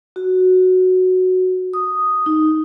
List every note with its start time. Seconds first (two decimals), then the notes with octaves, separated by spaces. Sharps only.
0.16 F#4
1.74 D#6
2.26 D#4